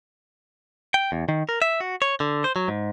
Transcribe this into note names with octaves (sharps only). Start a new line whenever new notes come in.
G5
E2
D#3
A#4
E5
F#4
C#5
D3
C5
F#3
G#2